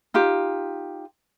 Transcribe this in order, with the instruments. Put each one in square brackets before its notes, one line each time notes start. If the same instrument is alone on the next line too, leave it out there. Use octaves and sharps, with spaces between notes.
[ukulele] D#4 F4 G4